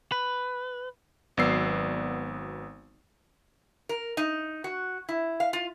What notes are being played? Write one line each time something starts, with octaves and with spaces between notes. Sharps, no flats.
B4
G#1 F#3 B3 D5 E6 C7
A#4
D#4
F#4
E4
F5
F4